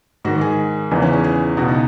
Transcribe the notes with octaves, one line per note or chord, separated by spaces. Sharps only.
G#2 D#3 F#4
G#4
E2 C#3 E3 D#4
C#4
G#4
G#4
C#2 B2 F#4
D#4